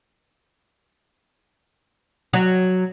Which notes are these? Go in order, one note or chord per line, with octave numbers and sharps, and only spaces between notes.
F#3